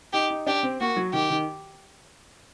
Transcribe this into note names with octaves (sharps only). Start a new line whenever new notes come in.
D#4 G4
D#4
D4 G4
C4
A#3 F#4
F#3
D#3 G4
D#3